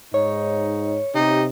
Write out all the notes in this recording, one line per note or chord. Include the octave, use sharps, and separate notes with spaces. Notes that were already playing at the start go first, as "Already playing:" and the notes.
G#2 D#4 C#5
C3 D#4 G4